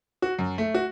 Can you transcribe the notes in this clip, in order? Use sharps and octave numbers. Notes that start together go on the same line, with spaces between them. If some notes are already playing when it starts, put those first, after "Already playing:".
F#4
F#2
A3
F#4